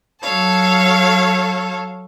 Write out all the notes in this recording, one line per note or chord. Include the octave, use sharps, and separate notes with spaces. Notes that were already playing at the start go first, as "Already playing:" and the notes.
F#3 A4 C#5 F5 A5